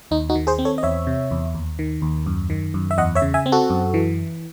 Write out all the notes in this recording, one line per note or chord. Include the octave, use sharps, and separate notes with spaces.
D#2 D#4
D#4 F#4
D#3
G#4 C5
C4
A4 C#5
D#5
E2 C#5 E5
C3
E2
D#2
D#3
D#2
F#2
D#3
F#2
E5
E2 D#5 F#5
C#5 E5
C#3
E5 G#5
C4
F#4 A4
F#2
E3